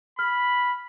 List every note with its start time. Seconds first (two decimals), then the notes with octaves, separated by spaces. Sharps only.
0.19 B5 F6